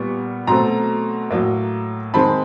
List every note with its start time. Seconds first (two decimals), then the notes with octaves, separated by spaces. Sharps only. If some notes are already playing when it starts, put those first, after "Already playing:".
Already playing: A#2 G3 B3 C#6
0.47 B2 F#3 A3 C4 A#5 C6
1.31 A2 F#3 A#3
2.14 D#3 G#3 C4 A5 B5